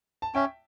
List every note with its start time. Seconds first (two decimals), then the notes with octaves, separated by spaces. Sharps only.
0.22 A5
0.35 C#4 E5 G5